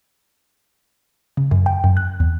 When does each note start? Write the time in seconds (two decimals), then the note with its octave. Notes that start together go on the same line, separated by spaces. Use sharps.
1.37 C#3
1.51 F#2
1.66 G5
1.84 F#2
1.97 F#6
2.20 E2